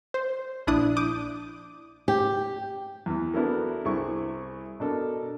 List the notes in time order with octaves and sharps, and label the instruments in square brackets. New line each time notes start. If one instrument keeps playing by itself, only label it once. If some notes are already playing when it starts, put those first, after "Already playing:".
[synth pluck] C5
A#1 D4 E4 D5 D#6 F#6
D6 D#6 G6 D#7
[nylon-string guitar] G4
[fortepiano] E2 E3
B3 D4 E4 F#4 A4 A#4
C2 E4 G#4 C#6
B2 D4 A4 A#4